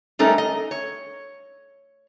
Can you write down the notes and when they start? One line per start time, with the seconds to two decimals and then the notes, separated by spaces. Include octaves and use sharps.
0.19 G3 A3 C#4 D#4 A#4
0.38 D#5
0.71 C#5